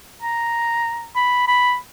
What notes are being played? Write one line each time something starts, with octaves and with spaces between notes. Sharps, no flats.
A#5
B5
B5